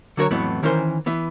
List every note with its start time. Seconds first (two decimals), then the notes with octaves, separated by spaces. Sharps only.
0.17 D3 F#3 F#4 A#4 C#5
0.31 F2 A2 E3 F#3 B3
0.63 D#3 E3 C#4 A#4 C5
1.06 E3 B3